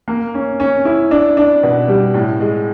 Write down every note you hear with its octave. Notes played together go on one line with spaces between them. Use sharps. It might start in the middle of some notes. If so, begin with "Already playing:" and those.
A#3
C#4
C#4
E4
D4
D4
B2
G3
A2
G#3